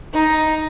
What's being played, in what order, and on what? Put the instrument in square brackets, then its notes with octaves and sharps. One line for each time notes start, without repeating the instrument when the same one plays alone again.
[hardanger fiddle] D#4